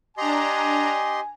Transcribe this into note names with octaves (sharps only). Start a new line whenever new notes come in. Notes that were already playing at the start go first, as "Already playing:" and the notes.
D4 G4 D#5 G#5 A#5 C6